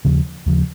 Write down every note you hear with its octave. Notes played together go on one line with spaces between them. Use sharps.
D#2 C#3 F3
D#2 C#3 F3